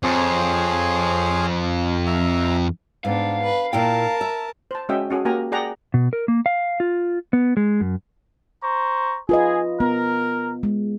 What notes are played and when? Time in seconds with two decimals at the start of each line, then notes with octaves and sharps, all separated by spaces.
0.03 F2 G#4 C5 C#5
2.07 E5 A#5
3.05 G#2 B3 D4 F5
3.43 B4
3.73 A#2 E4 A#4 G5 A5
4.21 E5
4.71 C5 A5
4.89 G#3 C#4 F#4 D#5 E5 G5
5.10 C#4 F#4 G#4 A4
5.25 A#3 F#4 G4 A#4 G#5 A#5
5.52 G#4 D5 F#5 G5 A#5
5.94 B2
6.13 A#4
6.28 A#3
6.46 F5
6.80 F4
7.33 B3
7.57 G#3
7.81 F#2
8.64 C5 A#5 C#6
9.29 F4 G#4 B4 D#5
9.80 B3 A#4
10.63 G#3